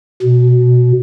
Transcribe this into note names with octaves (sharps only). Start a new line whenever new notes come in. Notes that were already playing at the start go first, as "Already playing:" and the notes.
B2